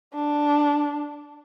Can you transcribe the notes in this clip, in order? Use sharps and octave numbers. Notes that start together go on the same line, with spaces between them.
D4